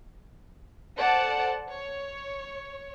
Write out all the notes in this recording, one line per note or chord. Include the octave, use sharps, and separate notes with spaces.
A4 C5 D5 F#5 A5
C#5